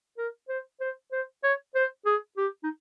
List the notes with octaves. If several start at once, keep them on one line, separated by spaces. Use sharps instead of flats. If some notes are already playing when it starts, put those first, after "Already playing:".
A#4
C5
C5
C5
C#5
C5
G#4
G4
D#4